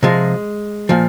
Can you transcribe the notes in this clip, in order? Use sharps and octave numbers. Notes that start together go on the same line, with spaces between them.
C3 F3 G#3
A#2 F3